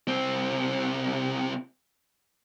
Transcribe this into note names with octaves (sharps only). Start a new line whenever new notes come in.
C2 C4